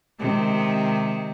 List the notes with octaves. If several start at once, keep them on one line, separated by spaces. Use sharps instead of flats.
C3 D#3 G#3